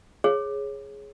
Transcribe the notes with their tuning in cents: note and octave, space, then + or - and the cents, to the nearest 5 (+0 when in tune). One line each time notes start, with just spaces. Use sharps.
G#4 +0 C#5 -15